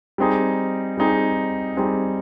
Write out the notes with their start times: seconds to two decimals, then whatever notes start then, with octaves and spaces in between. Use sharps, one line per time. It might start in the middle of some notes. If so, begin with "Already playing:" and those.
0.18 G3 C4 D#4 G#4
0.97 G3 C4 D#4 G#4
1.77 G3 C4 D#4 G#4